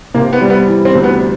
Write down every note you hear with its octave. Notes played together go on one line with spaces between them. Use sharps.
C3 A#3
B3
G3
B3
E3
C4
D2
B3